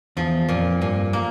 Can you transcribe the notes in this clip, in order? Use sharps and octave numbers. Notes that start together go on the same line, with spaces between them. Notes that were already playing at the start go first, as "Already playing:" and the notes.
E2 F3
F2 A#2
G2 A#2
A#3